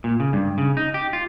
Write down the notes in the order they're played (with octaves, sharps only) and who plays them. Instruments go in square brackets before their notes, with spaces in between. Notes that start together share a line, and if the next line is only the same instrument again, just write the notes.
[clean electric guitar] A#2
C#3
G2
C#3
D#4
G4
F4